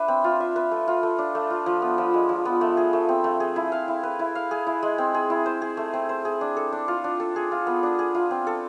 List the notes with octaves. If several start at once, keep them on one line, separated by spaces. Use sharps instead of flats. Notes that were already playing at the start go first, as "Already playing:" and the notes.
Already playing: D4 B4 E5
C4
F4
E5
B4
A3
F4
A3
D4
A3
F4
F3
B3
F3
G#3
F3
B3
A3
G#4
A3
C4
A3
G#4
E4
F5
E4
B4
E4
F5
G#4
E4
G#3
C4
G#4
E4
C5
G#4
A3
C4
C5
G#4
D4
A4
D4
F4
D4
A4
G#4
F4
B3
D4
G#4
F4
C4
A4